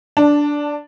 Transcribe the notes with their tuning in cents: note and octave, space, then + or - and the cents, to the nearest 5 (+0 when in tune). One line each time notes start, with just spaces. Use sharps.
D4 -5 A5 +15